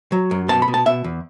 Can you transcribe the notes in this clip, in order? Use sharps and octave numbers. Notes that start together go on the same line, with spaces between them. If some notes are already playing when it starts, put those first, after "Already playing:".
F#3
F#2
B2 A5
B5
B2
A5
B2 E5
E2